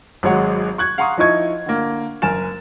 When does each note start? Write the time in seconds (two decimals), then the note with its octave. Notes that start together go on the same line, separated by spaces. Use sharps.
0.23 G#1 F#3 G#3 C#5 F#5
0.78 C#6 F#6 G#6
0.98 F5 F#5 A#5 C6 C#6 D#6
1.18 F3 D#4 E4 D#5 C#6 G#6
1.66 D3 A#3
2.22 F#1 A#4 G#5 A6 E7